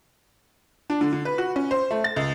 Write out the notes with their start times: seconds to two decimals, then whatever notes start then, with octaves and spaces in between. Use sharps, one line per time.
0.90 D4
1.01 D3
1.13 D3
1.25 B4
1.38 F#4
1.56 C#4
1.71 C5
1.91 A3
2.04 A6
2.16 C#2